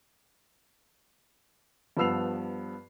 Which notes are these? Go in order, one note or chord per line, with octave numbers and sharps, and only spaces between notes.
G2 F3 B3 E6 C7 F7